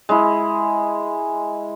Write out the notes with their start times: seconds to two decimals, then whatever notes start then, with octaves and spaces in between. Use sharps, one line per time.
0.09 G#3 E4